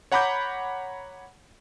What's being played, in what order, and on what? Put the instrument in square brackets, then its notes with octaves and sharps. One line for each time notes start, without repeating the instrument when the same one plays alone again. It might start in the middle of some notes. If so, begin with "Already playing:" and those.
[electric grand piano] C#5 F#5 A#5 B5 D6 G6